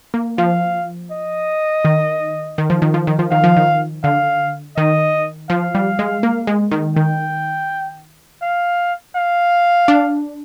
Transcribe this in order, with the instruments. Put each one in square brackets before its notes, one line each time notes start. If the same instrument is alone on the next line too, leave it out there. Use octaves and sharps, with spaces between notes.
[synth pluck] A#3
[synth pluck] F3 [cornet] F5
[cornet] D#5
[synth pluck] D#3
D#3
F3
D#3
F3
D#3
F3
[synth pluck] D#3 [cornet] F5
[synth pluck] F3
D#3
[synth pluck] D3 [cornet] F5
[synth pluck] D#3 [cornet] D#5
[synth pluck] F3 [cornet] F5
[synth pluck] G3
G#3
A#3
G#3
D#3
[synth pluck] D#3 [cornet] G5
[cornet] F5
F5
[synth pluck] D4